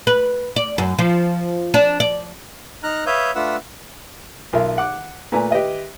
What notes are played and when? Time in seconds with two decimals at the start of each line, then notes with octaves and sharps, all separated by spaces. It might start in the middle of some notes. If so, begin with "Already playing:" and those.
0.07 B4
0.56 D5
0.78 F#2
0.99 F3
1.74 D4
2.00 D5
2.83 D#4 A#5 F6 F#6
3.06 B4 C#5 E5 F5 D#6 G6
3.35 A3 D4 F4 B4 F#5 E6
4.53 B1 F4 A#4 E5
4.78 F#5 D6
5.32 A#2 A3 B4 G#5 A#5
5.51 G4 B4 D#5 E5